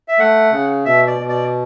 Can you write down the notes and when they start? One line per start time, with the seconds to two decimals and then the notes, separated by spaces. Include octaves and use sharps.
0.08 E5
0.19 A3 F#5
0.52 C#3
0.85 B2 E5
1.07 D5
1.19 B2
1.29 D5